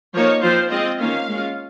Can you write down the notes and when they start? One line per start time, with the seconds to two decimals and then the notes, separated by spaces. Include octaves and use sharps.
0.14 F3 A#3 D#4 C#5
0.42 F3 C4 F4 C5
0.70 G#3 C4 F4 D#5
0.99 D#3 A#3 C#4 F4 F5
1.28 G#3 C#4 F4